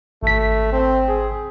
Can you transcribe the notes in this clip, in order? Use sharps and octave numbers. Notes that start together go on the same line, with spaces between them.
G#1 A3 B6
C4
G#4